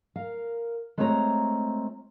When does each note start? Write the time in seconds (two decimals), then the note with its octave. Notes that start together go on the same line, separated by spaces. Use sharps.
0.16 A#4 F5
0.98 G#3 A3 C4 F4 C#5 A#5